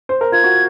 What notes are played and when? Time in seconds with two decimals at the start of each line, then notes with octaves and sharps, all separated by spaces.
0.09 C5
0.21 A#4
0.32 F4 G#6
0.44 F#4